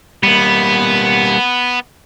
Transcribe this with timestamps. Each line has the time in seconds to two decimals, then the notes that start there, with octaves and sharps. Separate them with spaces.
0.23 G3 A#3 B3